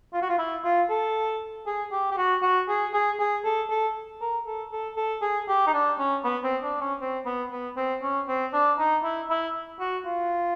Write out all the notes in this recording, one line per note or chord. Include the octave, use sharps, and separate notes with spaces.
F4
F#4
F4
E4
F4
A4
G#4
G4
G4
F#4
F#4
G#4
G#4
G#4
A4
A4
A#4
A4
A4
A4
G#4
G4
D#4
D4
C#4
B3
C4
D4
C#4
C4
B3
B3
C4
C#4
C4
D4
D#4
E4
E4
F#4
F4